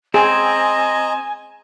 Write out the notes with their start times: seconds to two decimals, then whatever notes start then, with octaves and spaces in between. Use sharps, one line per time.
0.14 C4 G#4 D#5 G#5 A#5